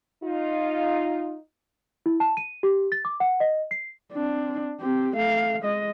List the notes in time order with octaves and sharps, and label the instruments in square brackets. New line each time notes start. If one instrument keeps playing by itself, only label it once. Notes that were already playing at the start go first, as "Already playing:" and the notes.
[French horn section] D#4 F4
[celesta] E4
A5
D#7
G4
A6
D6
F#5
D#5
C7
[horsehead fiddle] C4 D4
C4 G4
A3 F5
G#3 D#5